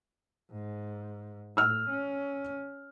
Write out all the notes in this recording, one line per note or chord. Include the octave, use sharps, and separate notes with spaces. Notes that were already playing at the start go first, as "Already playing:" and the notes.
G#2
A2 E6 F6
C#4